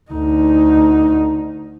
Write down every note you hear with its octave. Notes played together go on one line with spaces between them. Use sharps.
D2 D#4